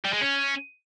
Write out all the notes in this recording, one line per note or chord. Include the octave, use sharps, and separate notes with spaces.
G3
G#3
C#4